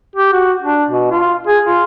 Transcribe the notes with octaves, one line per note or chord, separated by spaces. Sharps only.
G4
F#4
D4
B2
F4
G#4
F4